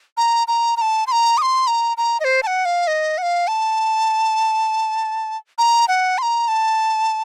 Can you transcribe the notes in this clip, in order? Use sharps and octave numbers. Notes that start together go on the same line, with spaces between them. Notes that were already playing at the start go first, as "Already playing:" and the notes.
A#5
A#5
A#5
A5
C6
A#5
D#6
C6
A#5
A#5
D#5
C5
A5
F#5
F5
D#5
F#5
F5
A5
A#5
F#5
C6
A#5
A5